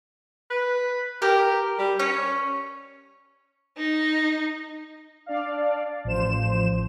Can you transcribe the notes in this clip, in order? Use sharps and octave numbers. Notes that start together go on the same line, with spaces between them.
B4
G4 A#4
G3
C#4 C#5
D#4
D4 D5 F5
A1 F3 C5 E7